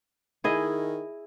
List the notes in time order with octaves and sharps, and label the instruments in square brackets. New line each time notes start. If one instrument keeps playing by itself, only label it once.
[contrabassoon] D#3 [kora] E4 G#4 D#5